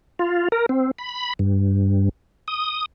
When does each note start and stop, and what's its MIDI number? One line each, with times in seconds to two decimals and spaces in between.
0.19 0.48 65
0.52 0.66 70
0.69 0.91 60
0.99 1.33 83
1.39 2.09 43
2.48 2.86 87